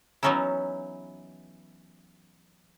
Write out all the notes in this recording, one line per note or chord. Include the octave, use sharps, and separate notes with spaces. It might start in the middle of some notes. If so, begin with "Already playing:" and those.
E3 F#3 B3 C#4 D#4 E4